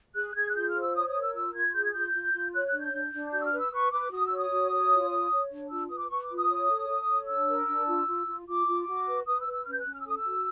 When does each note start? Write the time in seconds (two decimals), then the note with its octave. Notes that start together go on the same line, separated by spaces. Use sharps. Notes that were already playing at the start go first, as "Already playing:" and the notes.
0.15 G#4 F#6
0.35 G#4 G#6
0.49 F#6
0.55 F4 G6
0.69 F6
0.76 C5
0.81 E6
0.95 C#5 D#6
1.09 D#6
1.15 A#4
1.21 E6
1.34 F4 E6
1.54 F4 G#6
1.74 G#4 G6
1.84 G#6
1.93 F4 G6
2.14 F4
2.33 F4
2.54 C#5 F#6
2.67 F#6
2.73 D4
2.80 G6
2.93 D4
3.13 D4
3.33 F#4 G6
3.41 E6
3.45 F6
3.52 B4
3.59 E6
3.73 B4 C#6
3.93 B4 D6
4.11 F#4 D#6
4.25 E6
4.31 C#5
4.39 D#6
4.51 F#4
4.71 C#5
4.91 F4
5.10 C#5
5.31 C#5
5.51 D4
5.70 F4 E6
5.89 B4 D#6
5.97 D6
6.10 B4 C#6
6.23 D6
6.30 F4
6.36 D#6
6.50 C#5
6.69 A4
6.89 A4
7.10 C#5
7.29 D4 E6
7.49 A#4
7.68 D4
7.88 F4
8.08 F4
8.27 F4
8.48 F4 D6
8.67 F4
8.88 F#4
9.07 B4
9.26 B4 D#6
9.40 E6
9.47 B4
9.53 E6
9.66 C#4 F6
9.73 G6
9.79 F#6
9.87 C#4
9.93 F6
10.01 E6
10.06 A4 D#6
10.16 E6
10.26 F#4